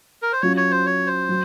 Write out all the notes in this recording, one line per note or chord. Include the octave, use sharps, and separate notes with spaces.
A#4
C5
F#3 C#4 F4 C#5
C#5
C5
C#5
C5
F#3